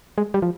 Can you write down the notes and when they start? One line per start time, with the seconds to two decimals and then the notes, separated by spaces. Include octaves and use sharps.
0.18 G#3
0.34 G3
0.42 F3